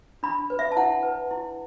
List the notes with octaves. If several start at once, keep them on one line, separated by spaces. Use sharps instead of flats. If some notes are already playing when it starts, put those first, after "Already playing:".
D4 B5
B4
E5
A5
E4 F#5
B4
E4